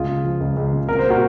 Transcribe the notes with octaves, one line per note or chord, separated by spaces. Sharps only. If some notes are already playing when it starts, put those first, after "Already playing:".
Already playing: C#2 F4 G#4
C#3
F3
C#2
C#2
C#3
C2 A#4
C5
A#2
F#4 A#4